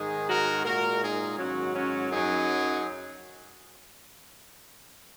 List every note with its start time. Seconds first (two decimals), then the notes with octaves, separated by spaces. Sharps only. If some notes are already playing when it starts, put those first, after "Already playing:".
Already playing: G#2 D#3 G#3 D#4 G#4
0.29 F#4 A#4
0.65 A#2 G#3 F#4 A#4
1.02 D#4 G#4
1.38 G#2 D#3 F#3 C#4 F#4
1.74 C#4 F#4
2.10 F#2 F#3 D#4 G#4